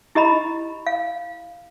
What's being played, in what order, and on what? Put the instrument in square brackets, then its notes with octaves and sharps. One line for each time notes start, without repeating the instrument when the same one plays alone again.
[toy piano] E4 G4 D#5 A#5 B5
F5